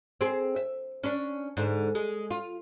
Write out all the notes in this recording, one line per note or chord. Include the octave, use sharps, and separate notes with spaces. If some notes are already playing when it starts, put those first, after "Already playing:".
C4 G#4
E5
C#4 D4
G#2 D3
G#3
F4